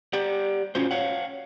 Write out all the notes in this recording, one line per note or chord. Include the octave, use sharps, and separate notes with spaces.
G4 D5 F#5
C#4 F4 F#4 C5
C#5 F5 F#5